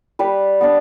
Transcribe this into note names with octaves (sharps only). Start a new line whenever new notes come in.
G3 B4
B3 D4